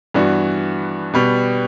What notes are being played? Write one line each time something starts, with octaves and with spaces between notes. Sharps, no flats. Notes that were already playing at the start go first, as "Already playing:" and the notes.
G2 E3 B3 D4 F#4
B2 G3 B3